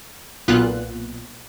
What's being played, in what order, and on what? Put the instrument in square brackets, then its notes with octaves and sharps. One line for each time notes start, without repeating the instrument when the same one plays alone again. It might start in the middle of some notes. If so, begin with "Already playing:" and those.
[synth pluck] B1 A#2 B3 F4 F#6